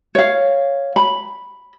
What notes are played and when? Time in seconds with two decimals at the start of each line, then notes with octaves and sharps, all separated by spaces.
0.15 C#5 F5
0.96 B5